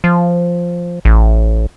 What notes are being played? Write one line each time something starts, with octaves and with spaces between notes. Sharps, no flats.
F3
A1